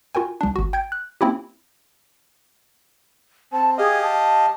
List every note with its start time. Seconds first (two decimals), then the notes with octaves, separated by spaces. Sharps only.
0.15 F4 F#4 A#4 G5 G#5
0.41 C2 D4
0.56 G#1 F#4
0.73 G5 G6 G#6 D7
0.92 F#6
1.21 A#3 C4 C#4 E4 F4 G4
3.52 C4 A5
3.78 G4 G#4 D#5 F5
4.02 A5